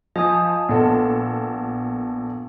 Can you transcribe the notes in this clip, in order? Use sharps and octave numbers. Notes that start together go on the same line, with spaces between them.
F3 D#5 G#5 D#6
A#1 B3 A4